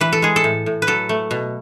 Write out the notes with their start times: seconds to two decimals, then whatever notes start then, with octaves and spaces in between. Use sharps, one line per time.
0.01 E3 B4
0.13 A4
0.22 G#3 G#4
0.36 A4
0.44 A2
0.66 A2
0.82 B4
0.87 F#3 A4
1.09 A3
1.31 B2